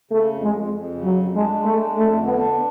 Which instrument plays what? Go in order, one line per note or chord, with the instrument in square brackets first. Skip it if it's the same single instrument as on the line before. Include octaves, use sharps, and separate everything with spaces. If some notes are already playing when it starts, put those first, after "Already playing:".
[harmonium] C#3 [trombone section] A3
[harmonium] F2
[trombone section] G#3
[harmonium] F2
F2
C#3
[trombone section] F#3
[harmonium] F2
[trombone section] G#3 [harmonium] D4
[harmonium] G#3
[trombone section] A3
[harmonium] D4
[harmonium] F2 [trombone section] A3
[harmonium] D3
[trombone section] B3
[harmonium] D4